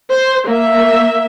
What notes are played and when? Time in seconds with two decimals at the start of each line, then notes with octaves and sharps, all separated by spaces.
0.11 C5
0.47 A#3 E5